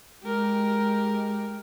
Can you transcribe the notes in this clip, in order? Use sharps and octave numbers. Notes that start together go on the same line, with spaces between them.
G#3 G4 A#4